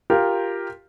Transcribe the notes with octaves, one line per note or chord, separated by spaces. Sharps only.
F4 G4 A#4